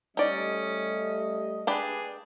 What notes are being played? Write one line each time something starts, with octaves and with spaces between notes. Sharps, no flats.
G3 A3 C#4 D#4 D5 D#5
D4 G4 G#4 B4